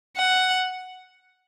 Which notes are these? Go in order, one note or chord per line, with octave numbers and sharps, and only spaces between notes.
F#5